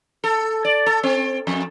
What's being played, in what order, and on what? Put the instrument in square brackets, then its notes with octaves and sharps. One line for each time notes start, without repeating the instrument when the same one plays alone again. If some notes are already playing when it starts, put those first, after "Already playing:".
[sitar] A4
D5
A4
C4
F2